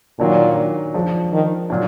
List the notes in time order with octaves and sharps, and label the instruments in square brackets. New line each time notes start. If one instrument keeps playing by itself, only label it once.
[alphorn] A#2 [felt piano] D#3 F#3 D4
[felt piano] F3 G#3 D4
[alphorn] D#3
[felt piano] A#2 F#3 D4